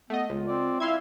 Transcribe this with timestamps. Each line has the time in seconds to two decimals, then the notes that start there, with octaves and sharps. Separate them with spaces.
0.10 A3 B3 D#5
0.30 C#2 F4
0.47 C4 D5
0.80 E4 E5 F5 C6 G#6